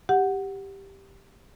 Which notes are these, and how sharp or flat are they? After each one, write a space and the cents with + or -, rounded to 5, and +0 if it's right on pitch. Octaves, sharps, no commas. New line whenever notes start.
G4 +0 F#5 +0